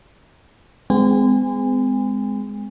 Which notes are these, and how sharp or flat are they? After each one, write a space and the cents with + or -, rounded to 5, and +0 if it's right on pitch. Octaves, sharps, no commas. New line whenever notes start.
G#3 +0 C4 -40 G#5 -35